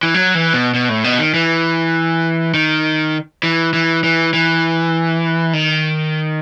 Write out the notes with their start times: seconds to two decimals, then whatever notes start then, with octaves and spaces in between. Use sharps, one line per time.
0.03 E3
0.14 F#3
0.35 E3
0.54 B2
0.74 B2
0.89 A2
1.04 B2
1.19 D#3
1.34 E3
2.54 D#3
3.43 E3
3.73 E3
4.04 E3
4.34 E3
5.53 D#3